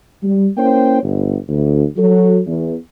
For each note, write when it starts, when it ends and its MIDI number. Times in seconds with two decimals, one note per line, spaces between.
0.23 0.47 55
0.57 1.02 58
0.57 1.02 61
0.57 1.02 64
0.57 1.02 72
0.57 1.02 73
0.57 1.02 79
1.03 1.35 31
1.48 1.84 38
1.97 2.38 54
1.97 2.38 66
1.97 2.38 69
2.46 2.74 40